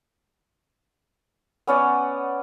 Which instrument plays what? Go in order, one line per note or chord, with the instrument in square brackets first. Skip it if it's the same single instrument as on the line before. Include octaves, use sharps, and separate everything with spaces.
[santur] B3 C#4 D5 F#5